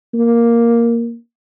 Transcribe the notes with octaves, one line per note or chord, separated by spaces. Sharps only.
A#3